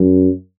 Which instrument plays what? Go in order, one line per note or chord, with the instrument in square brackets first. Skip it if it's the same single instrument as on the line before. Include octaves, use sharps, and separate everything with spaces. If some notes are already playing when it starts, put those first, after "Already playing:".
Already playing: [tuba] F#2